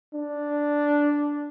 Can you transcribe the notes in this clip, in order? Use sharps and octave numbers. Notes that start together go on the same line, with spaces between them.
D4